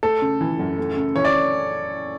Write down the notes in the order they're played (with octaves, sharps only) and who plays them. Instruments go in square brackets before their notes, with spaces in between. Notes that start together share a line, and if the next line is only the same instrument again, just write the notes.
[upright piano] A3 [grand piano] A4
[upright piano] C#3
E3
F#2
A3
C#3
[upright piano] E3 [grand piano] C#5
[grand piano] D5